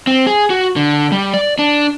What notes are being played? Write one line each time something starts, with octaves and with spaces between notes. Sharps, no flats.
C4
G#4
F#4
D3
G3
D5
D4